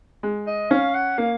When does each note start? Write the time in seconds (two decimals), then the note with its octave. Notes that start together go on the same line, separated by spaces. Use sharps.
0.23 G#3
0.47 D#5
0.71 C#4 F5
0.95 F#5
1.18 A#3 F5